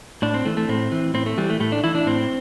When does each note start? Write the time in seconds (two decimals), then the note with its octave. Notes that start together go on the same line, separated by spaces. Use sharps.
0.22 A2 D4
0.34 C4
0.45 E3 A3
0.57 A3
0.69 A2 C4
0.92 E3
1.14 A2 C4
1.26 A3
1.38 E3 G3
1.50 A3
1.60 A2 A3
1.72 D4
1.84 E3 E4
1.95 D4
2.06 A2 C4